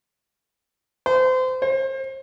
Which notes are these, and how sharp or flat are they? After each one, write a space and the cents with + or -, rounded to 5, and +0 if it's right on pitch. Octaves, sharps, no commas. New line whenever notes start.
C5 -30
C5 +35